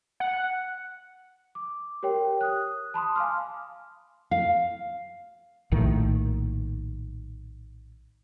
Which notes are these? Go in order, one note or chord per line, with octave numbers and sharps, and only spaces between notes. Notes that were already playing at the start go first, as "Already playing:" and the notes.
F#5
D6
G4 A#4 C#5 G5
D#6 F#6
A5 B5 C6 D#6
F5 G#5 A5 C6 D6 F6
F5
A#1 A2 D#3